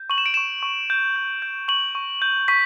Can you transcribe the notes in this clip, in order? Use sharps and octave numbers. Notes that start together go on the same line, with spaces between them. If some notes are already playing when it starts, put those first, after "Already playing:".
Already playing: G6
C#6 F#7
E7
D7
C#6 E7
C#6
G6
G6
G6
C#6 F#7
C#6
G6
C#6 B6